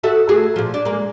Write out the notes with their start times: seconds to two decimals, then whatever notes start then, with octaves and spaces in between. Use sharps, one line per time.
0.04 F#4 A4 E5
0.29 A3 F#4 G#4
0.56 A#2 F3
0.74 D4
0.85 G#3 A#3